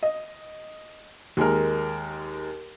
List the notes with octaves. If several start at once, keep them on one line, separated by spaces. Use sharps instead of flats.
D#5
D#2 G#3 A#4